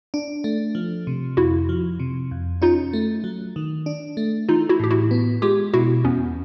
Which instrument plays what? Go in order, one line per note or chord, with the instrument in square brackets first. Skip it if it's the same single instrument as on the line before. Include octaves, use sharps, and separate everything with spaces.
[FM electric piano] D4
A3
F3
C3
[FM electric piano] F2 [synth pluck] E4 F#4
[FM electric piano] F3
C3
F2
[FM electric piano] C#4 [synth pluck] D#4 F4
[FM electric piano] A3
F#3
D#3
D4
A3
[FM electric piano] E3 [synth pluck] D#4 F4
[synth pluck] E4 F#4
[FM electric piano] A2 [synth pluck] G4
[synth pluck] E4 F#4
[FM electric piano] B3
[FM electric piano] G#3 [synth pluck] F4 G4
[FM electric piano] B2 [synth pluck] E4 F#4
[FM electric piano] E2 [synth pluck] B3 C#4